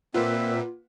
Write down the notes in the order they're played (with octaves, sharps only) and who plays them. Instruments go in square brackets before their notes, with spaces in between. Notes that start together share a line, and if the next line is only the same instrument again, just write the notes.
[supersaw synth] A#2 [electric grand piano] A#3 B4 F#5 [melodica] C4 E5 [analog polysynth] F4